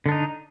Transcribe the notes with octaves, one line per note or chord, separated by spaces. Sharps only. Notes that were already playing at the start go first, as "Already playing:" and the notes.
D3 D4 D#4